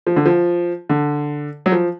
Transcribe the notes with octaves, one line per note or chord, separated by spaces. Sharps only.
F3
D3
F3
D3
F#3
F3